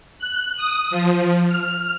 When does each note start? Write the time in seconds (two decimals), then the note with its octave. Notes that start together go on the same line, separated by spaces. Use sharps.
0.19 F#6
0.57 D#6
0.91 F3
1.48 F6